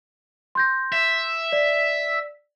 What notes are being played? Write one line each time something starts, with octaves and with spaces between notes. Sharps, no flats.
C6 G6 A#6
E5
D5